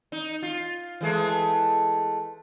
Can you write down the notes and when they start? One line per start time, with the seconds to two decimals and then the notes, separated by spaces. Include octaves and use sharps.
0.12 D#4
0.43 F4
1.01 E3 G#3 A3